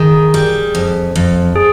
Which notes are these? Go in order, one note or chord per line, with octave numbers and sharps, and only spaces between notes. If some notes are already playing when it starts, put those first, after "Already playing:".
Already playing: D#3 G#4
G3
F2
F2
G#4